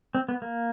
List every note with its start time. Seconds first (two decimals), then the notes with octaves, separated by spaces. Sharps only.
0.15 C4
0.29 B3
0.42 A#3